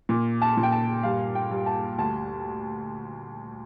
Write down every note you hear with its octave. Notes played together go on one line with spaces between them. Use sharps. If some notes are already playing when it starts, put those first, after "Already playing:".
A#2
A5
A#2
G5
A5
G2 F5
G5
G2
A5
D2 A5